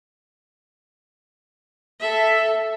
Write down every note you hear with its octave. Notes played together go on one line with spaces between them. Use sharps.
A4 E5